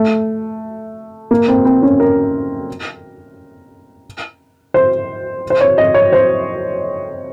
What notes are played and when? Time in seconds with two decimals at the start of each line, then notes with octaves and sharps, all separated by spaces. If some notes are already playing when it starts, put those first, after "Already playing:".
Already playing: A3
1.31 A#3
1.48 C4
1.65 C4
1.83 C#4
2.00 A#4
4.74 C5
5.50 C5
5.61 C#5
5.78 D#5
5.94 C#5
6.12 C5